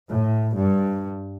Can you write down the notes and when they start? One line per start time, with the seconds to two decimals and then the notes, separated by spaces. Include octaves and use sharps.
0.12 A2
0.56 G2